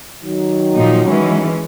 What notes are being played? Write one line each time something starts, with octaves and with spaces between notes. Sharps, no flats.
D#3 F#3
A#2 F3 D#4
E3 G#3 C#4